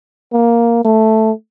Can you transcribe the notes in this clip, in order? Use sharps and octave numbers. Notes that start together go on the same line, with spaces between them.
A#3
A3